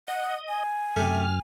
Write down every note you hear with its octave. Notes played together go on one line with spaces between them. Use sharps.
D#5 F#5
G#5
F#2 C3 A3 F6